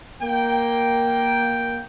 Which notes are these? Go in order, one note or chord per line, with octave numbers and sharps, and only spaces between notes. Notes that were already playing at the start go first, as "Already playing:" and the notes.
A#3 G5